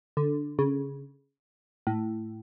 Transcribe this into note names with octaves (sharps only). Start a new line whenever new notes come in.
D3
C#3
A2